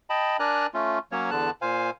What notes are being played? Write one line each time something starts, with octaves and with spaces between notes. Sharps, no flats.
D#5 G5 A5 B5
D4 A#4 D5 G#5 A#5 F#6
A3 C#4 F4
F#3 A#3 C#4 C#5
E2 D3 A5 F#6
A#2 C5 F5 G#5